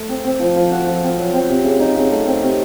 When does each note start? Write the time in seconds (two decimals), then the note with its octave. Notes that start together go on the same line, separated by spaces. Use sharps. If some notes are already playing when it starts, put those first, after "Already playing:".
Already playing: A3
0.09 C4
0.24 C4
0.40 F3
0.56 F3
0.71 F#4
0.87 F3
1.03 C4
1.18 F#3
1.33 C4
1.49 C3
1.64 C#3
1.80 D#4
1.96 C#3
2.11 A3
2.26 C4
2.42 C3